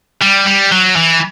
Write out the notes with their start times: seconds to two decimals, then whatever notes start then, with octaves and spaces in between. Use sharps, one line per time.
0.22 G3
0.47 G3
0.72 F#3
0.96 E3